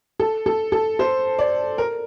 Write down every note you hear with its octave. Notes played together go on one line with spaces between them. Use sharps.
A4
A4
A4
C5
D5
A#4